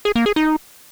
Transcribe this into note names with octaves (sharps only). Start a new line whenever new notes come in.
G#4
A#3
G#4
D#4